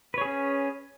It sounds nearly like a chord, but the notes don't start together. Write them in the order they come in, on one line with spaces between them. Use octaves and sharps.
B4 C#5 G#4 C#4